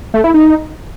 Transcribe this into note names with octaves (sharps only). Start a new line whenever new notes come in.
A3
E4
D#4